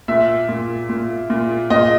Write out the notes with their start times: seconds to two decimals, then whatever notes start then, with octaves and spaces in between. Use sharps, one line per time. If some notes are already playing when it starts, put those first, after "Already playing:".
0.08 A#2 E5
0.49 A#2
0.89 A#2
1.30 A#2
1.70 A#2 D#5